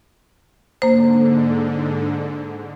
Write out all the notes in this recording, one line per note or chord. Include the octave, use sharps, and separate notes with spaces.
G#2 D3 A#3 C5